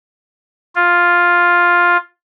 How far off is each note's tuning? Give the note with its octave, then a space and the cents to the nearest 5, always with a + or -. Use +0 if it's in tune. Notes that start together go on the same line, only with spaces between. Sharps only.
F4 +5